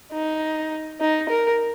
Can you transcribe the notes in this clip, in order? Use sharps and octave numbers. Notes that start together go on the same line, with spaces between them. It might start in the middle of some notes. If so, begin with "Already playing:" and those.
D#4
D#4
A#4